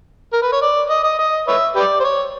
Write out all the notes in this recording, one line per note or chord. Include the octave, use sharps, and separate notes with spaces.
A#4
B4
C#5
D5
D#5
D#5
D#5
B4 C#5 E5
G4 B4 D5
C5
C#5